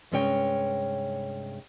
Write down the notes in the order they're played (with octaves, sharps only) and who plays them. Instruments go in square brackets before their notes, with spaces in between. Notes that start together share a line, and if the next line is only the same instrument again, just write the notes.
[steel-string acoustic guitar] G2 C3 G#3 C#4 C#5 G5